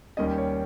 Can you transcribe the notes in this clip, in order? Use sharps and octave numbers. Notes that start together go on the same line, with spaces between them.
D#2 D#3 G3 C#4 D#5
C#5